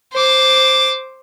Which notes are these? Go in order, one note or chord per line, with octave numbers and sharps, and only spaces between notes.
C5 D6